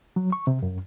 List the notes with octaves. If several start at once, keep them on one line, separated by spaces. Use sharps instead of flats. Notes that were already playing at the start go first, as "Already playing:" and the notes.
F#3
C#6
C3
F#2